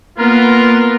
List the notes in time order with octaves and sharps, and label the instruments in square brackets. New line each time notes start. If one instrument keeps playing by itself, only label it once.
[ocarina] A#3 [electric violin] B3 [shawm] F4 [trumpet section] A#4